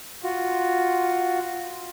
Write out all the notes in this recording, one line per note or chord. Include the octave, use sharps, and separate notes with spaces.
F4 F#4